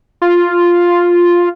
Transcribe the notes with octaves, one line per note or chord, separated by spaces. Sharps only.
F4